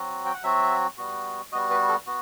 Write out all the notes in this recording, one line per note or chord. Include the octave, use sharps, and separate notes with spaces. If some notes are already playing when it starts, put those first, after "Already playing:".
Already playing: F#3 C4 F#4
G5
F#5
F#3 C4 F#4 E5
G3 B3 F#4
G3 B3 F#4 D#5
B4
A4
B3 F#4